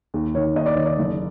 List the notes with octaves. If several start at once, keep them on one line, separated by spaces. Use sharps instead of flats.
D#2
D#3 C#5
D#2 D#5
D5
D#3 C#5
D5
F#1